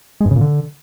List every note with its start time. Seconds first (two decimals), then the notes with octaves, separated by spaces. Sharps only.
0.21 G#3
0.26 G2
0.31 C#3
0.36 A#2
0.41 D3